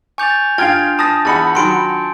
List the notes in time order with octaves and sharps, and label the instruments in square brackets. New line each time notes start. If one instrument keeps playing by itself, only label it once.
[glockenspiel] G#5 G6 F7 [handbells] C#6 D6 A6
[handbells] D4 F4 [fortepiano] F5 G5 [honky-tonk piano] F6 G#6 D7 [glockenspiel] A6
[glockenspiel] A5 [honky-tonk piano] D#6 A6 A#6
[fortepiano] E2 [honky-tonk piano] F#5 B5 D#6 [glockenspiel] A6 C#7
[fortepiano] D#3 F#3 [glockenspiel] C6 D7